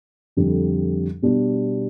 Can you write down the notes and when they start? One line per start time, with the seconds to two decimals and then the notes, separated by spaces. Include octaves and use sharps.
0.37 F2 D3 G3
1.22 B2 G3 D4